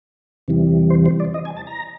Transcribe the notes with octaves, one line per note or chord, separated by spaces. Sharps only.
E2 C3 E3 G3
C5
C5
D5
D#5
G#5
A5
A#5